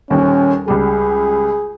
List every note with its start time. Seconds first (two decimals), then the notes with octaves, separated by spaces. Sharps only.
0.10 D#1 D#2 C#4
0.68 C#2 G3 G#4